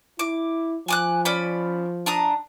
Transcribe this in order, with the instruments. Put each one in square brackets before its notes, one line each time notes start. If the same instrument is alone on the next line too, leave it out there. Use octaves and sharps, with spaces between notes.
[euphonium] E4 [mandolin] D6
[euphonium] F3 [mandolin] G#5 D6 F#6
[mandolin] C#4 D5 B5
D4 A#5 D#6